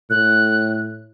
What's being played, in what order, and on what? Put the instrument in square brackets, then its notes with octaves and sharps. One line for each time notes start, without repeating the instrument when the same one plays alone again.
[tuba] A2 [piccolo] F#6